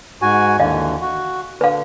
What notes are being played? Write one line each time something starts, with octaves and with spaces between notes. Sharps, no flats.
G#2 F#4 G#5
D#2 D3 E3 D#5 F5
F#4
D3 B4 F5